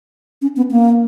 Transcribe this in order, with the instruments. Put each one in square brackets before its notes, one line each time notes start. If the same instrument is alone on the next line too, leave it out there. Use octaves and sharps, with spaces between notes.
[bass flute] C#4
B3
A#3